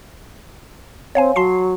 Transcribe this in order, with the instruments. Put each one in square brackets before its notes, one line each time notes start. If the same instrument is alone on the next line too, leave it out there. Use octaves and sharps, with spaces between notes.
[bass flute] C4 [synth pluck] C#5 F5 G#5
[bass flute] F#3 [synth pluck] A5 C6 C7